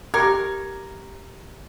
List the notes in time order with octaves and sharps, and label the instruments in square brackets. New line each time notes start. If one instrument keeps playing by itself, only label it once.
[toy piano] G4 G5 D6 [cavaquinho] A#4 [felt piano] G#6